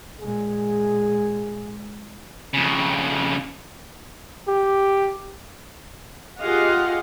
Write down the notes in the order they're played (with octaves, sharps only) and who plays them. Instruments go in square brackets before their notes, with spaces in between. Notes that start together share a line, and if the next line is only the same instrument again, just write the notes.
[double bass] A#2 G#3 [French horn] G#4
[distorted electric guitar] F2 C#3
[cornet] G4
[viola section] F4 G4 G#4 D#5 F5 F#5